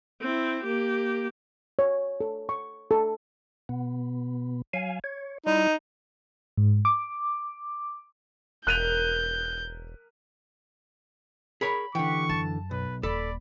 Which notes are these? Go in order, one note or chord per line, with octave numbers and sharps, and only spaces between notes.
C4 E4
A#3 G4
C#5
A4
C#6
A4
B2 B3
F#3 F5 G#5
C#5
G3 D#4 E4
G#2
D6
E1 A#4 F#6 G6 D#7 F7
G#4 A#4 C#5 B5
D3 E3 G4 F#5 C#6
F#2 A5
B1 B4
D#1 A4 D5 B5